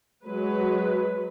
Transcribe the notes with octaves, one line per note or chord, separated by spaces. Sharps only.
F#3 G#3 B4